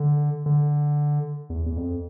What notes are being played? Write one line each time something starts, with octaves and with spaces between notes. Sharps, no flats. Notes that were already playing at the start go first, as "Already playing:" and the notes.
Already playing: D3
D3
E2
E2
F2